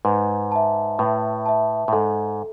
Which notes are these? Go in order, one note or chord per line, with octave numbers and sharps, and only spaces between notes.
G#2 B4
E5 A5
A2 B4
E5 A5
A2
G#2 A4